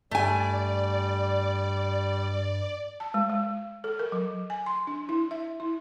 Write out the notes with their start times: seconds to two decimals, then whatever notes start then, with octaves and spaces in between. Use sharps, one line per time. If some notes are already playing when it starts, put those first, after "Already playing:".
0.11 G2 G3 A3 D5 G#5
3.00 A5
3.14 G#3
3.29 G#3
3.84 A4
3.99 A#4
4.12 F#3
4.50 G#5
4.66 C6
4.87 D4
5.09 E4
5.31 E5
5.60 E4